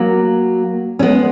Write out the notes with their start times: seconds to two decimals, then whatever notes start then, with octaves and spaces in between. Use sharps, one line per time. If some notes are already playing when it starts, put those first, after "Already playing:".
Already playing: F#3 A#3
0.99 C#4
1.02 G#3 B3